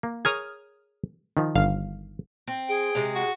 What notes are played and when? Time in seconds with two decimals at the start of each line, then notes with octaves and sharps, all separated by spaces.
0.03 A#3
0.25 G#4 A#4 C#5 D#6 F6 G#6
1.37 D#3 F3
1.55 G1 F5
2.48 C4
2.69 G#4 G5
2.95 C3 G#3
3.15 F#4